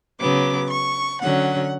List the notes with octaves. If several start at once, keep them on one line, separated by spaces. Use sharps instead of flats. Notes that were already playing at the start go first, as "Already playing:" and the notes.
C#3 F#3 B3 D6
C#6
D3 F#3 C#4 F#5